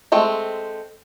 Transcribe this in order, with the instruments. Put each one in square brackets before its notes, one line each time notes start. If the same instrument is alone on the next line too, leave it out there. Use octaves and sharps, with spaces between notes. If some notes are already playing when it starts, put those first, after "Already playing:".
[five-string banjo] G#3 A3 C4